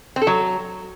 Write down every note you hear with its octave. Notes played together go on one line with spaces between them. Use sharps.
C4
A4
F#3